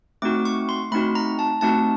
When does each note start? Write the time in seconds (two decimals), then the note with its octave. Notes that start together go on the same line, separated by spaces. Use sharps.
0.22 A3 C4 D#4 F#4 D6
0.45 C#6
0.69 C6
0.92 A3 C4 D#4 F#4 B5
1.15 A#5
1.39 A5
1.61 A3 C4 D#4 F#4 A5